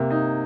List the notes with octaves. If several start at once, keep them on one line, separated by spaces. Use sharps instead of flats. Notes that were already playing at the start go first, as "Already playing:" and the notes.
Already playing: C3 A#3
D#4